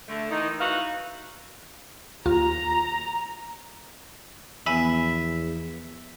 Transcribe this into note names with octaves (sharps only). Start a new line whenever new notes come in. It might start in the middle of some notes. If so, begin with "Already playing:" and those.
D3 A3
D#3 E3 D#4
D#4 E4 F#4 B4 F5
D#2 F4 A#5
E2 F3 B3 E5 G#5 B5